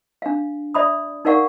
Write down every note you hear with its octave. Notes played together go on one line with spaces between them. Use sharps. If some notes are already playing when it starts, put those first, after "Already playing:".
D4 F5
D5 E5 B5 D#6
D#4 A#4 D5 F5 F#5 C#6